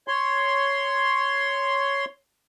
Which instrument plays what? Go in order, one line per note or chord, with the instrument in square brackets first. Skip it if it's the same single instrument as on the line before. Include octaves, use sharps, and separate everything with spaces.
[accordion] C#5 C6